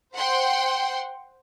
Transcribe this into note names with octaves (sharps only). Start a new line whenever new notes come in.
C5 F#5 G5 C6